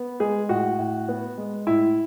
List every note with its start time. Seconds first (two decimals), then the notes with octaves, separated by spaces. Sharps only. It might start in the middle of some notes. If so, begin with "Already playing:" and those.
Already playing: B3
0.20 G#3 G#4
0.49 A2 F#4
0.79 A2
1.08 B3
1.38 G#3
1.67 A2 E4